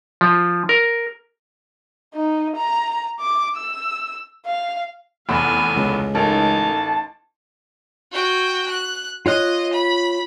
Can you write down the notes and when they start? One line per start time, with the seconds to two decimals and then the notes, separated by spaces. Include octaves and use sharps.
0.21 F3
0.69 A#4
2.14 D#4
2.55 A#5
3.20 D6
3.56 E6
4.46 F5
5.29 F1 E2 F5 G#5 B5
5.76 C#2
6.15 A1 D#4 A4 A#4 G#5 A5
8.12 F#4 G5
8.69 F#6
9.26 F4 C#5 D#5 F#6
9.73 B5